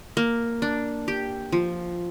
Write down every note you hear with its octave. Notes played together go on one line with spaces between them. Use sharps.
A#3
D4
G4
F3